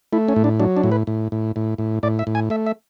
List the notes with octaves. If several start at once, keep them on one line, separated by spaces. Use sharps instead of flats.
A3 E4
C#4
A2
D4
F#3 D4
D4
A2
B4
A2
A2
A2
A2
A2 D5
E5
A2
G#5
A3 E5
E5